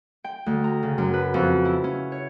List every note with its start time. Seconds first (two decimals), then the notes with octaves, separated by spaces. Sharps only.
0.24 G5
0.46 D2
0.64 A#5
0.83 C#3
0.98 F#2
1.14 B4
1.34 F2
1.65 E4
1.84 C#4
2.12 C#5